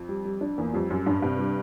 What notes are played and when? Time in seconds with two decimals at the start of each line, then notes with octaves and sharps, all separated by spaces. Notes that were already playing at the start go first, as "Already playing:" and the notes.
Already playing: F2
0.09 G3
0.25 G3
0.41 D4
0.57 E2 A#3
0.73 F2 G3
0.90 F#2 G3
1.06 G2 D4
1.22 G2 C3
1.39 G3